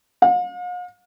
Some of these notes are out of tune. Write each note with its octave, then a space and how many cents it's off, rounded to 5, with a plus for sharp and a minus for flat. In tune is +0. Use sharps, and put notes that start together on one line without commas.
F5 +45